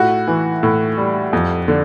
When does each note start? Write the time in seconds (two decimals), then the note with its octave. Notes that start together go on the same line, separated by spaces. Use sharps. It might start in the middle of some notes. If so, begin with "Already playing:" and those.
Already playing: A2 F#4
0.28 E3
0.63 A2
0.97 G3
1.33 F2
1.68 D3